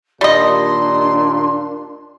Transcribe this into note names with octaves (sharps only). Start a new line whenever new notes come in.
D#2 A#2 G3 D4 D#5 C6